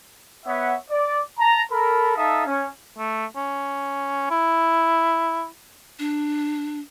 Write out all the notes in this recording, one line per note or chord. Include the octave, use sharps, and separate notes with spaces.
B3 C#5 E5 F#5
D5
A5 A#5
A4 A#4 B5
D#4 A4 E5 F5 A5 D#6
C#4
A3
C#4
E4
D4